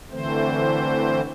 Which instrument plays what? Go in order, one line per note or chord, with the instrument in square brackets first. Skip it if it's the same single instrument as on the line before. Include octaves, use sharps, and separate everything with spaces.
[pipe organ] D3 E3 A3 C4 C5